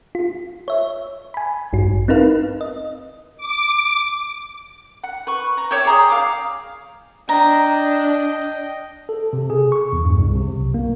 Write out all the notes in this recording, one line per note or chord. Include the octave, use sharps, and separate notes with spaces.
F4
C#5 E5
G#5 B5
A1 G2 F#4
C4 D#4 E4 A#4 B4 F5
D#5
D6
F#5
B4 C#6
A#5
C#5 D5 E5 G5
G#4 A#5 D#6
F5 D6
D4 D#5 G5 A#5
A4
C3
G#4
C#6
E2
G2
C2
C3
B1
A#3